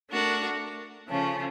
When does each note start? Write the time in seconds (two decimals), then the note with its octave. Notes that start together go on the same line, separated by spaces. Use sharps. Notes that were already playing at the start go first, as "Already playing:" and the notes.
0.11 A3 D4 F#4 A#4
1.08 C#3 F3 A3 C#4